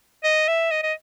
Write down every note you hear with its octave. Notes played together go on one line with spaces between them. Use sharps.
D#5
E5
D#5
D#5